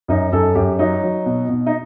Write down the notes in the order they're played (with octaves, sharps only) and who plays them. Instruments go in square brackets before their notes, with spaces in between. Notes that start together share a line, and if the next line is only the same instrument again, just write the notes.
[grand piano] F#2 D#4
F#2 A4
F#2 G4
F#3 D#4
F#3
B2
B2
D#4